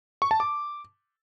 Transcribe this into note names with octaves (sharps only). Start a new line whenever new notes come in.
C#6
A5
D6